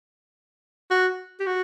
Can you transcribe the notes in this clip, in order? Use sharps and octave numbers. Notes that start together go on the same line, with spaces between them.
F#4
G4
F#4